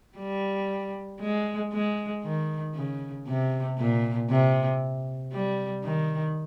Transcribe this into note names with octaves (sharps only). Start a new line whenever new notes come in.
G3
G#3
G#3
D#3
C#3
C3
A#2
C3
G3
D#3